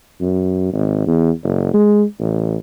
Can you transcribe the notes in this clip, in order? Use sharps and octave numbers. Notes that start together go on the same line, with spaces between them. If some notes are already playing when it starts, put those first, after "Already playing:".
F#2
G#1
E2
F#1
G#3
A1